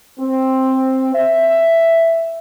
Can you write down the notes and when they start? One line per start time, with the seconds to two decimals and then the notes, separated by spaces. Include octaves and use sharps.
0.20 C4
1.15 E5